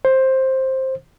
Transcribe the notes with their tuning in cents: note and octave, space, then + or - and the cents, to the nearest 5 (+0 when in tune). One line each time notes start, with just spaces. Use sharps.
C5 +10